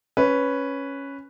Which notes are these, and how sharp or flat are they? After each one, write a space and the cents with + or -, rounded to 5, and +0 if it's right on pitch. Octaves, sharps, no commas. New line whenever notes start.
C#4 +0 B4 +0